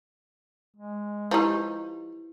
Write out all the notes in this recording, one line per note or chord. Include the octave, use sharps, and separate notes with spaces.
G#3
F3 D#4 E4 G4 B4